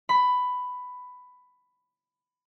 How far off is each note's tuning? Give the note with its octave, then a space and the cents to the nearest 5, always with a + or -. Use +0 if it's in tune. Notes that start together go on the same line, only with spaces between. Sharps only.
B5 +10